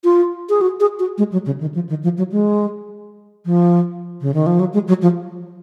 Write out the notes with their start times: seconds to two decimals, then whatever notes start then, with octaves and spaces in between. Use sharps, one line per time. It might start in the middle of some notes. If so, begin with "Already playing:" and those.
0.04 F4
0.49 G#4
0.61 F#4
0.80 G#4
0.99 F#4
1.18 G#3
1.32 F#3
1.46 C#3
1.61 D#3
1.75 F3
1.89 D#3
2.03 F3
2.18 F#3
2.32 G#3
3.45 F3
4.21 C#3
4.34 D#3
4.46 F3
4.59 F#3
4.73 G#3
4.88 F#3
5.02 F3